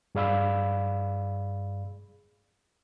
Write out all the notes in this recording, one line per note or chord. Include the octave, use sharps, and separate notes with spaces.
G2 G#4 D5 F5 B5 E6